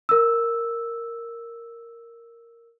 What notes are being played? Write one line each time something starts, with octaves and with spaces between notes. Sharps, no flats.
A#4 E6